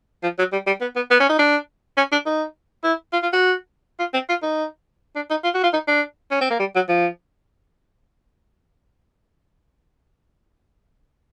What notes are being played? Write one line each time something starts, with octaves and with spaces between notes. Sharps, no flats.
F3
F#3
G3
G3
B3
B3
B3
C#4
D#4
D4
C#4
D4
D#4
E4
F4
F4
F#4
F4
C4
F4
D#4
D4
D#4
F4
F#4
F4
D#4
D4
C#4
C4
A#3
G3
F#3
F3